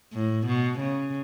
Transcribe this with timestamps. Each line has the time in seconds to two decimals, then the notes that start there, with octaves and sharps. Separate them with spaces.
0.13 A2
0.47 B2
0.79 C#3